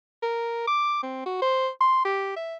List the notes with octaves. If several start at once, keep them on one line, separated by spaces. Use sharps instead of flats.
A#4
D6
C4
F#4
C5
C6
G4
E5